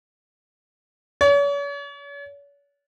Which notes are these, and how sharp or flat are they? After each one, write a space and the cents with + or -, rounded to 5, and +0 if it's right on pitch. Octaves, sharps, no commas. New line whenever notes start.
C#5 +40